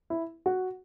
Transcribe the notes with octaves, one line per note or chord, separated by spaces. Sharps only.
E4
F#4